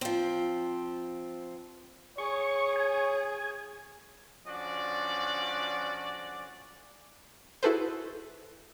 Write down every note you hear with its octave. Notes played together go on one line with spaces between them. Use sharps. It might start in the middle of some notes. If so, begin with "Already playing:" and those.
F3 C4
G#4 C#5 C#6
G#5
D3 F3 C#4 F#4 D5
E4 F#4 G#4 A4 B4 C5